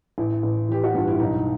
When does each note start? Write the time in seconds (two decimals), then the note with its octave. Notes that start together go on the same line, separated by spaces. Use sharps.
0.18 A1 E4
0.43 A1
0.69 E3 G4
0.84 F#4
0.94 G2 F4
1.08 E4
1.20 B1 D#4